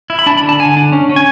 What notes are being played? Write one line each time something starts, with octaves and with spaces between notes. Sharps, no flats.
E4
B5
D4 A5
B5
D3
A5
D3 G#5
D4
C#4
C#4
G#5